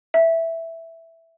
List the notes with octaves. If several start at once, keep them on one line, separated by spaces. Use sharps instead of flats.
E5